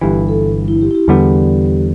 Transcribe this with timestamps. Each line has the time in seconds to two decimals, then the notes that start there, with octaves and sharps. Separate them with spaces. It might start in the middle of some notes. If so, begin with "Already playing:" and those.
0.01 G1 G2 E3 G4
0.29 A4
0.54 G3
0.68 E4
0.81 G4
0.91 E4
0.95 G4
1.08 E2 D3 G3 B3 G4